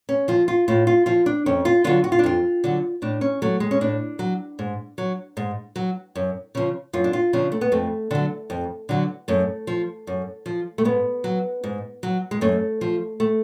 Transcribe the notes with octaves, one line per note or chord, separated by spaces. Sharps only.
C#4
F3 F4
F4
A2 F4
F4
F3 F4
D4
F2 C#4
F4
D3 F#3 F4
F#4
F4
D4
F2 F4
D3 F#3
A2 D4
C#4
F#3 A3
G#3
C#4
A2 D4
F#3
G#2
F#3
G#2
F#3
F#2
C#3 F3
F#2 F4
D4
F4
C#3 F3 D4
A3
B3
F2 A3
D3 F#3
F2
D3 F#3
F#2 A3
F3
F#2
F3
A3
G#2 B3
F#3
G#2
F#3
G#3
F#2 A3
F3
A3